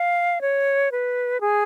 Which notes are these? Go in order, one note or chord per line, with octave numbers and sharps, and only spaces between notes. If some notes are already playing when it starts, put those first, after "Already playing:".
Already playing: F5
C#5
B4
G#4